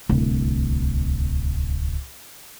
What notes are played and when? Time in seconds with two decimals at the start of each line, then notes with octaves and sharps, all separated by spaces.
0.09 D1 C2